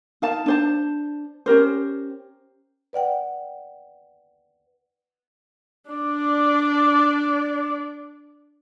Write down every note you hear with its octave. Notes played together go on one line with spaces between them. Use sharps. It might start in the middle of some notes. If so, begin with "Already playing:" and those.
D#4 F5 A5
D4 C5 A5
C#4 G4 A#4 C5
B4 D5 F#5 G5
D4 D5